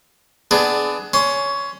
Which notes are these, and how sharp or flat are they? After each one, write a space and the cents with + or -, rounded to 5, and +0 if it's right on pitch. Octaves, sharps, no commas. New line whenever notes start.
B3 +30 D4 +15 G#4 +25
C#4 +15 C6 +0